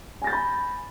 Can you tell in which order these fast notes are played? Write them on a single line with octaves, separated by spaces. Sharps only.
G#5 A#6 A6 G6 B5